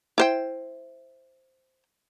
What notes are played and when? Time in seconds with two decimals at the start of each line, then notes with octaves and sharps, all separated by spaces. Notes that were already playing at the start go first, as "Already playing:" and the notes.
0.18 E4 C5 G5